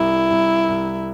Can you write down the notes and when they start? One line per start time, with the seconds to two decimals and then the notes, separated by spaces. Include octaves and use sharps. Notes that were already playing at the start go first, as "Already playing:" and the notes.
Already playing: C2 E4
0.30 C2
0.69 C2